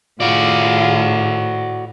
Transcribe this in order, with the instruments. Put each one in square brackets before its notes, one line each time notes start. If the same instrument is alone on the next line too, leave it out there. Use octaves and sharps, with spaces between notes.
[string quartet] A2 [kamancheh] F4 G#4 [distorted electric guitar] F#4 D5